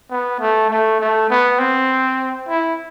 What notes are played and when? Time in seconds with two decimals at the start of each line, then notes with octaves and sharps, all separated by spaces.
0.11 B3
0.39 A3
0.70 A3
1.00 A3
1.30 B3
1.59 C4
2.48 E4